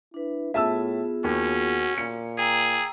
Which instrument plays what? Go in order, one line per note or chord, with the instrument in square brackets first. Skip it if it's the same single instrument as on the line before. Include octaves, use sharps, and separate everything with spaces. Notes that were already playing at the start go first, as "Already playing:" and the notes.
[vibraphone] D4 B4 [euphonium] E4
[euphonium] A2 [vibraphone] B3 F4 G#4 [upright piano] E5 A5 E6
[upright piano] D#2 [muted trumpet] C#4 [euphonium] F#4
[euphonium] A#2 [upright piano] C#7
[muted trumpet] G#4 [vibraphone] G5 A#5 E6